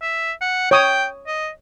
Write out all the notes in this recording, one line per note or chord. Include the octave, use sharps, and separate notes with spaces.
E5
F#5
C#5 G5 D#6
D#5